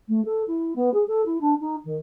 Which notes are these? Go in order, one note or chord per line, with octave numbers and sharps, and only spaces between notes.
A3
A4
E4
B3
G#4
A4
E4
D4
D#4
D#3